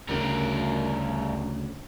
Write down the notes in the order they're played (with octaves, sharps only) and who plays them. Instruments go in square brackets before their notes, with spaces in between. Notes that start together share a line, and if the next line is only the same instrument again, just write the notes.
[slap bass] D2 C#3 [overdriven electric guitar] G2 A#4